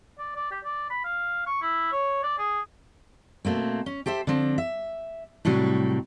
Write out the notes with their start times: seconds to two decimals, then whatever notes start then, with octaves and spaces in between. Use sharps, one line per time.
0.19 D5
0.35 D5
0.51 G4
0.64 D5
0.90 B5
1.05 F5
1.46 C#6
1.62 E4
1.92 C#5
2.23 D5
2.38 G#4
3.45 B2 A3 A#3 C4
3.86 C#4
4.06 G4 A4 C5 E5
4.27 D3 F3 C4
4.58 E5
5.45 A2 C3 F#3 G3